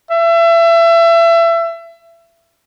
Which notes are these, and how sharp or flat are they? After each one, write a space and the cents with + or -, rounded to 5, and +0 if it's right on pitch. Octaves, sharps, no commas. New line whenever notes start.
E5 +30